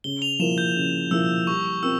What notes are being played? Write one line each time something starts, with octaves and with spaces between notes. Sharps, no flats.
C#3 G7
F7
F3 A#3 E4 A#4 E7
G6
C#3
F3 A#3 E4 A#4 E6
G3 C#6
C4 F4 A#4 E6